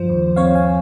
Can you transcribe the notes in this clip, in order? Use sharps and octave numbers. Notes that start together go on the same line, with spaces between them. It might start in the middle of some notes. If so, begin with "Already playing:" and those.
Already playing: G2 F3 C5
D#2
C4 C#5 F5
F5 G#5